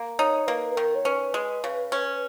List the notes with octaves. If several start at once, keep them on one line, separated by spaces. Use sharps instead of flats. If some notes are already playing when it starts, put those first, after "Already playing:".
Already playing: A#3
D#4 C#5
A#3 B4
B4
D#3 A#4
C#5
C#4 B4
G#3
C#3
C#4